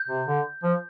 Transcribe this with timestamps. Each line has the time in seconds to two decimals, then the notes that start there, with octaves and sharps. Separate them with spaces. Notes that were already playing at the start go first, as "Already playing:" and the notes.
Already playing: G6
0.08 C3
0.26 D3
0.63 F3